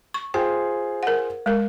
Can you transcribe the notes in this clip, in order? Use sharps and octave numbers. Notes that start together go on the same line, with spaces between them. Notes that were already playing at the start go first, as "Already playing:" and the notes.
C#6
F4 G#4 C5 G5
A#4 F#5
G#3 A#4